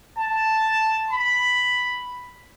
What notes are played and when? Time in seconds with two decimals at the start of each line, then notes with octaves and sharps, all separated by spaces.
0.19 A5
1.10 B5